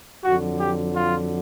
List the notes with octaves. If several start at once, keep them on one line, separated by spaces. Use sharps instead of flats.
F2 D3 F#3 F#4
G4
F4